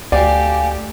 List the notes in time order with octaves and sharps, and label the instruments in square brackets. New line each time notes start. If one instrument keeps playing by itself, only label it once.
[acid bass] D2 [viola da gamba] A3 G4 [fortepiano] D5 [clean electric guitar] F5 G#5